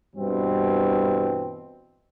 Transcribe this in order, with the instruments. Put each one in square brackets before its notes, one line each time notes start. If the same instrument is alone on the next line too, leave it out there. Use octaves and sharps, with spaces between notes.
[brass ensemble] G2 B2 E3 C4